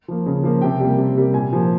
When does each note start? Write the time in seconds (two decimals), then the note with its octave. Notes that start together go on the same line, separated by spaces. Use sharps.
0.08 F3 A#3
0.26 C#3
0.44 F3 A#3
0.62 C3 G5
0.80 G3 A#3
0.98 C3
1.17 G3 A#3
1.34 A#2 G#5
1.53 F3 A#3